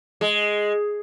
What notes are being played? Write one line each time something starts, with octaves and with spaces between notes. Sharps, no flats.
G#3